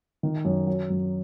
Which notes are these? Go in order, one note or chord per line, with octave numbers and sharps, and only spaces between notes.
D#3
F#2
F#3
F#2